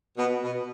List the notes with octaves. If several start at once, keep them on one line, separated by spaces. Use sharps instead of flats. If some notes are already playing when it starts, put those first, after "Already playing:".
B2
B2